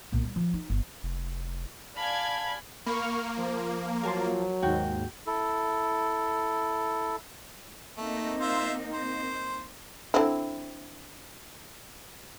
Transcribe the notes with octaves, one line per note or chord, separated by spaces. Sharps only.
B1 A#2
G3
F3
D#4
G1
F1
D5 F5 G#5 A5 B5 G#6
A#3 B5 C#6 F6
F3
F#3 A#4 A5 C6
D#2 G#2 F#4 G5
E4 A4
A3 A#3 C4 D#4
F4 C5 E5
C5
D3 C4 E4